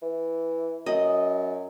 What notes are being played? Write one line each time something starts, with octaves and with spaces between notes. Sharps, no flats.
E3
F#2 D#5